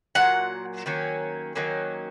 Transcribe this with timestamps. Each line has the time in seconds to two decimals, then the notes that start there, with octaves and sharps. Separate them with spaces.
0.15 A#2 F#3 F#5
0.86 D#3 F#3 A#3 C#4
1.55 D#3 F#3 A#3 C#4